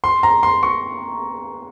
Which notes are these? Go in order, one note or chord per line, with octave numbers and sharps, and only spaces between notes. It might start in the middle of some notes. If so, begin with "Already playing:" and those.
C6
A#5
C6
C#6